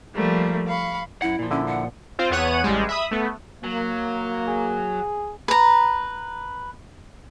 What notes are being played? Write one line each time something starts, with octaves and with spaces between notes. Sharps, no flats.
F3 G3 A3 A#3
F5 B5 C#6
F#2 E4 F#5
A#2 F3
D3 C#4 E4
F#5
C4 F4 C5
E2 B3 C#5 F#5 D#7
A1 G3 G#3
E5 B5 D#6
A3 B3
F#3 A#3
G#4
B4 A#5